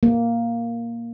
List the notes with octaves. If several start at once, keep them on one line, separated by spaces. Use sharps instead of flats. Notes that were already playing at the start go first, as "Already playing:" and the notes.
A#3